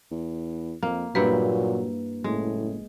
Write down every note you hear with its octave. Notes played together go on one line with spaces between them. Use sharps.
E2
F2 A#3
G2 A#2 F#3 A#3 E4 G4 B4
F#1 A2 G#3